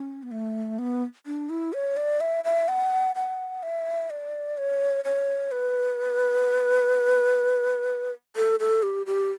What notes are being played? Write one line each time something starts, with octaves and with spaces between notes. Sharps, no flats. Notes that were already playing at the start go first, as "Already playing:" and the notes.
Already playing: C#4
B3
A3
B3
D4
E4
C#5
D5
E5
E5
F#5
F#5
E5
D5
C#5
C#5
B4
A4
A4
G4
G4